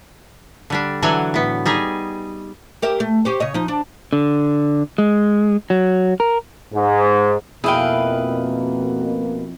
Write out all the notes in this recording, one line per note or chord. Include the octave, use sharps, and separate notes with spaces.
D3 G3 D4
D3 E3 F#3 A4 F#5 G#5
A2 B3
G3 D#4 G#4
G4 A#4 E5
A3
C#4 G4 C5
C#3 C#5 D#5
F3 D#4
D4
D3
G#3
F#3
A#4
G#2
F2 B2 A#3 E4 G#4 B4 F5 G5